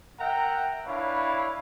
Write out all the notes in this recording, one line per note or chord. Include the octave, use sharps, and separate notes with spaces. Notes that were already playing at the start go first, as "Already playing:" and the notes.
A#4 E5 F#5 G5 A#5
D4 E4 B4 C#5 F5